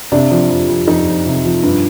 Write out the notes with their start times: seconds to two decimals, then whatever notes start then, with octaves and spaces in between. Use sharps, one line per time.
0.12 C3 D4
0.31 F3
0.50 F2
0.68 F2
0.87 F2 D#4
1.06 F2
1.26 C3
1.45 F3
1.63 G2